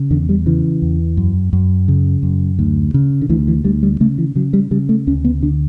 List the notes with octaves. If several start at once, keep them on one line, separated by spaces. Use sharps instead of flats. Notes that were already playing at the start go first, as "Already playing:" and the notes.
Already playing: C#3
E2 D3
G3
C#3 E3
E2
F#2
F#2
C#3
F#2
D2
C#3
D3
D2 E3
E3
D2 G3
G3
C#3 A3
E3
C#3 F#3
G3
C#3 G3
A3
D2 C#4
B3
D3 D4